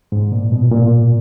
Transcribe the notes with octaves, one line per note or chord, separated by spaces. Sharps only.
G#2
A#2
B2
A#2